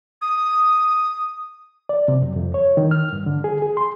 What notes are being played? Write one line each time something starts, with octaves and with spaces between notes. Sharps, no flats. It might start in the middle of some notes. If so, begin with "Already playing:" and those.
D#6
D5
C3
F#2
F2
C#5
D#3
F6
G2
D3
G#4
G#4
C6